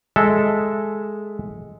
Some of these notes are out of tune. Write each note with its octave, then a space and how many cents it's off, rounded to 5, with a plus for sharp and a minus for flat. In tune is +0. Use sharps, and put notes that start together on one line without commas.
G#3 +0 A4 -5 E5 +0